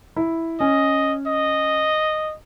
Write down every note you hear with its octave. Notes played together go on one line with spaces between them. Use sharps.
E4
C#4 D#5
D#5